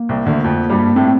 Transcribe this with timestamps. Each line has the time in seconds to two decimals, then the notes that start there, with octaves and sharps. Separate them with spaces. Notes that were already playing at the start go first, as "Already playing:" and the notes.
Already playing: A#3
0.09 C2 C3
0.26 D2 D3
0.44 F2 F3
0.70 G2 G3
0.96 A2 A3 C4